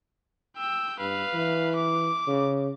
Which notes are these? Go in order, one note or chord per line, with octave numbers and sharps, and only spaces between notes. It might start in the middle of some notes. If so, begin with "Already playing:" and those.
G5 E6
G2 B4 F5
E3
D6
C#3